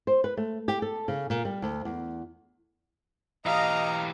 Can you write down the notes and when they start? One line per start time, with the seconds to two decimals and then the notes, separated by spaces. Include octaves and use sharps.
0.07 C5
0.24 B4
0.37 A3
0.68 G4
0.82 A4
1.08 C#3
1.30 A#2
1.45 G3
1.62 D2
1.85 E2
3.46 E3 G4 D#5 F5 A#5